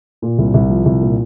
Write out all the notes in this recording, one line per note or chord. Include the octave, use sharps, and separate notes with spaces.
A#2
C2
C2
F3
C2
A#2